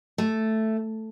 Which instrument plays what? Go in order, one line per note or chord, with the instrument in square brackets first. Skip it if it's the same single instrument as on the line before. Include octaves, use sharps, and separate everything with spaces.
[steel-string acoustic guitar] A3